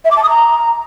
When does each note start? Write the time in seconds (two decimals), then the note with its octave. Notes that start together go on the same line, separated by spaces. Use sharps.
0.05 E5
0.11 D6
0.17 A5
0.23 D#6
0.29 A#5